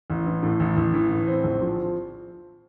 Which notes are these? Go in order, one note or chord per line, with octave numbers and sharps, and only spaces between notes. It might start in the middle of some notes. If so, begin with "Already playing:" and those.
A1
E3
A2
A1
A1
E3
A2
C4
A#1
F3